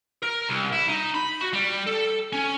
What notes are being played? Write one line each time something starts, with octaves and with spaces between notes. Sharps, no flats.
A#4
C2
E4
D#4
B5
F#4
G3
A4
C#4